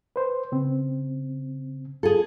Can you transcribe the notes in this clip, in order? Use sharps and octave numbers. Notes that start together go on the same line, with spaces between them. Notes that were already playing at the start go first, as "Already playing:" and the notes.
B4 C5
C#3 C4
F4 G#4 A4